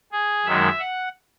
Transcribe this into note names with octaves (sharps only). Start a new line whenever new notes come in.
G#4
F#2 D#3 G#3 E5
F#5